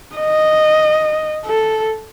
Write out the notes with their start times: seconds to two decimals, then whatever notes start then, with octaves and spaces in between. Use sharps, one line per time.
0.16 D#5
1.45 A4